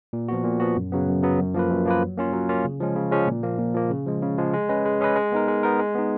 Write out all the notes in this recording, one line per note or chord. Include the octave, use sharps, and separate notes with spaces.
A#2
F3 B3 F#4
A#2
F3 B3 F#4
F#2
C#3 F#3 B3
F#2
C#3 F#3 B3
F#2
F3 A#3 F4 B4
F#2
F3 A#3 F4 B4
F#3
A#3 C#4 F4
F#3
A#3 C#4 F4
C#3
F3 G#3 C#4
C#3
F3 G#3 C#4
A#2
F3 A#3
A#2
F3 A#3
C#3
F3 G#3
C#3
F3 G#3
G#3
C#4 G#4 B4 D#5
G#3
C#4 G#4 B4 D#5
G#3
B3 D#4 A#4
G#3
B3 D#4 A#4
G#3
B3 D#4